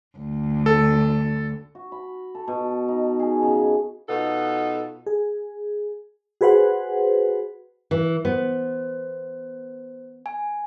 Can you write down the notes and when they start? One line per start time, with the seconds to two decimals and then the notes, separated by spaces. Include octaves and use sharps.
0.17 D2
0.66 A4
1.75 F#4
1.92 B5
2.35 A4
2.48 B2
2.88 D#4
3.20 G#4
3.42 C#3
4.09 B2 B3 D#4 F4 A4
5.07 G#4
6.41 F#4 G#4 B4 C5 F#5
7.91 E3
8.25 B3 C5
10.26 G#5